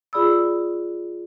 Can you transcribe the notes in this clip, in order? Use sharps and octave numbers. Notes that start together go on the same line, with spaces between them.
F4 G#4 D5 B5 D#6 E6